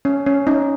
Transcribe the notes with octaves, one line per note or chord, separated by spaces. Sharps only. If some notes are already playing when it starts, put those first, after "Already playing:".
C#4
C#4
C#4 D#4